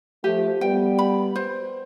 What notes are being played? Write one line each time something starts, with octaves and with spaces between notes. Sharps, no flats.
F3 A3 G4
G3 B3 G5
B5
C5